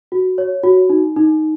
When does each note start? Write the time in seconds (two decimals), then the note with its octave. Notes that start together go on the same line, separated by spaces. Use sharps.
0.12 F#4
0.38 C#5
0.63 F#4
0.90 D#4
1.16 D#4